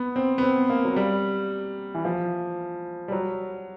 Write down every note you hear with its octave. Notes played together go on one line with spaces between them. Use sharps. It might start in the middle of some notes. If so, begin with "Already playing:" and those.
Already playing: B3
C4
B3
C4
A#3
F#3
G3
E3
F3
G3
F#3